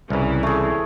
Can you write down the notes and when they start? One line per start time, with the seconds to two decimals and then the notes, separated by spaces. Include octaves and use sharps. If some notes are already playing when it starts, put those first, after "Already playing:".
0.10 C2 C#3 E3
0.43 A3 G#4